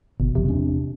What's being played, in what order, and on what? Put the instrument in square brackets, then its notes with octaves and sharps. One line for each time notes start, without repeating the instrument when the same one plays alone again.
[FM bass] G1 [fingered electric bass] B2
[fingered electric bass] F#1 B1 F3 [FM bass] C3
[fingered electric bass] E1 C4 D4